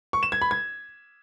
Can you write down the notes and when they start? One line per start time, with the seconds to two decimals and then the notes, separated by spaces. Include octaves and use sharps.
0.13 C#6
0.23 E7
0.32 G#6
0.42 B5
0.51 G#6